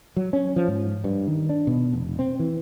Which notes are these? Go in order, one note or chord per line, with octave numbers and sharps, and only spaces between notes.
F#3
C#4
F3
G#2
G2
D#3
D4
B2
F1
C4
E3